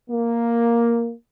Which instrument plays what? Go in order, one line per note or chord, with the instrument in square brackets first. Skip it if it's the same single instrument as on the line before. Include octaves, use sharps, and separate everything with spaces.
[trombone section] A#3